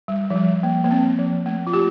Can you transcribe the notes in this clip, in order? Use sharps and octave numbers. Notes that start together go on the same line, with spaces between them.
G3
F3
G3
A#3
A#3
C4
F3
A3
F4
G4